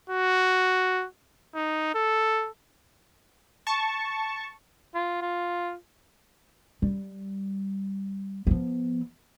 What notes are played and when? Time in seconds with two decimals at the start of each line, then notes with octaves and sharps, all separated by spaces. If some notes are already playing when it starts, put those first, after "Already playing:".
0.10 F#4
1.55 D#4
1.95 A4
3.67 A5 C#6
4.94 F4
5.22 F4
6.82 G3
8.47 F3 B3